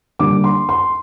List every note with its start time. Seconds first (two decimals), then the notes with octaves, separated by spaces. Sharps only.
0.19 D3 G3 A#3 D6
0.44 C6
0.69 C6